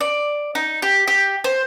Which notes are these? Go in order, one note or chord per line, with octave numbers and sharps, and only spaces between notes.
D5
D#4
G4
G4
C5